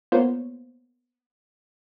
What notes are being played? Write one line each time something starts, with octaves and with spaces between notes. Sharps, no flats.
A#3 B3 F4 C5 C#5